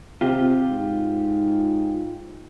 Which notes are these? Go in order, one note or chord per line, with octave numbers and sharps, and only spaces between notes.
C3 F4 G4
G#2